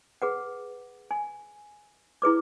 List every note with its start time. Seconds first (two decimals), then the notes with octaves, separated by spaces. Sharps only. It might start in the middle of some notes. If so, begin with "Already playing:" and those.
0.22 G#4 B4 F#5
1.11 G#5
2.22 E4 G#4 B4 D6